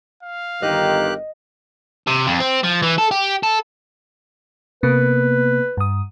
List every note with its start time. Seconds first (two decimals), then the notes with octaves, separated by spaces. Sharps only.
0.23 F5
0.62 G1 D#3 G4 D#5 F#6
2.07 C3
2.27 F2
2.40 C4
2.64 F3
2.83 E3
2.98 A4
3.11 G4
3.43 A4
4.83 C3 A#3 B3 B4
5.77 G2 D#6